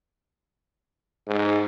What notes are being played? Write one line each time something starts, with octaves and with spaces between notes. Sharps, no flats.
G#2